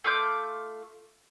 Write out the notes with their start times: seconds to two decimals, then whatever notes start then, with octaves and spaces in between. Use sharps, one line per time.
0.04 A3 F4 D6 G6